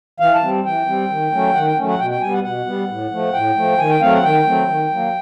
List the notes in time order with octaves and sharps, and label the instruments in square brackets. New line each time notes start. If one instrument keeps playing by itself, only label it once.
[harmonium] E3 F5
A5
G3 C4
E3 G5
G3 C4
D#3
F#3 A3 C#4
D#3 F#5
G5
F#3 A3 C#4
F#5
B2 G5
G5
G3 B3 G#5
F#5
B2 F#5
G3 B3
A2
F3 A3
A2 G5
F3 A3
D#3 G#5
G5
F#3 A3 C4 F5
F#5
D#3 G5
F#3 A3 C4
D#3
F#3 A#3